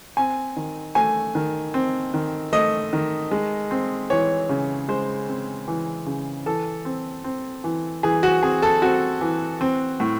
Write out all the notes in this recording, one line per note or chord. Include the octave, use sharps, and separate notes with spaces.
C4 G#5
D#3
A3 G#5
D#3
C4
D#3
A3 D#5
D#3
G#3
C4
E3 C#5
C#3
G#3 C5
C4
E3
C#3
E3 A4
C4
C4
E3
E3 G#4
F#4
C4 G#4
A4
C4 F#4
E3
C4
A2